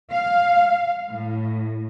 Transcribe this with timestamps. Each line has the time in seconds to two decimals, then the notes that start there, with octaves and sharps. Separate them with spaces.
0.10 F5
1.10 A2